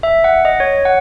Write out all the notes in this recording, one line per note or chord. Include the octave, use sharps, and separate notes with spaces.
E5
F#5
D#5
C#5
F#5